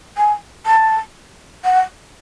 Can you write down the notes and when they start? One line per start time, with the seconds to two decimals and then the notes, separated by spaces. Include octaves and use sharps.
0.17 G#5
0.66 A5
1.64 F#5